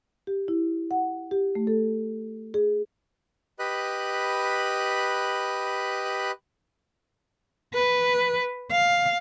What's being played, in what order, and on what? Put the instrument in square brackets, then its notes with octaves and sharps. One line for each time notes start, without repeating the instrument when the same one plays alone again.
[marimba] G4
E4
F#5
G4
A3
A4
G#4
[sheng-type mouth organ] G4 B4 D#5 B5 F#6
[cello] B4
F5